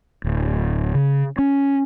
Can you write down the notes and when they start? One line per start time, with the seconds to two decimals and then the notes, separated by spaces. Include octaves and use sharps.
0.24 D1
0.95 C#3
1.38 C#4